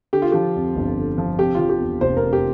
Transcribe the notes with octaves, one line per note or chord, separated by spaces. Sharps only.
D3 G4
F4
F3 G4
F2
G1
D3
F3
C3 G4
F3 F4
G4
E2
F1 C5
C3 A#4
G4